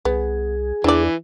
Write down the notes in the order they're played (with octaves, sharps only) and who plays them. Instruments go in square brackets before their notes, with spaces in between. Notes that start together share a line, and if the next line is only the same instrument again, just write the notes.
[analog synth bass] C2 [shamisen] B3 [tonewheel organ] G#4
[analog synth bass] E2 [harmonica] E3 [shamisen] D4 D5